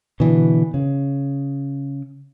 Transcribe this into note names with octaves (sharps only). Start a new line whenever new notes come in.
B2 D3 E3
C#3